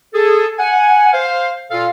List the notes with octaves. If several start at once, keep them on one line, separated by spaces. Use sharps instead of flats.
G#4 A4
F#5 G#5
C5 F5
A#2 F4 A4 F5